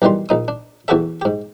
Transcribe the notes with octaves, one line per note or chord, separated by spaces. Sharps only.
B1 D#3 E3 G3 C6
A#1 D#4 D#6
D4
E2 E4 F#4 G4 A4 E5
G#2 G4